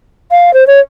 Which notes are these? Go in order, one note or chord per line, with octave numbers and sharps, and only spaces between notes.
F5
C5
C#5